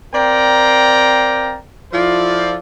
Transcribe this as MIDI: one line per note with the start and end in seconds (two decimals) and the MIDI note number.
0.13 1.57 60
0.13 1.57 70
0.13 1.57 74
0.13 1.57 77
0.13 1.57 79
0.13 1.57 82
1.92 2.56 53
1.92 2.56 64
1.92 2.56 65
1.92 2.56 69
1.92 2.56 72
1.92 2.56 74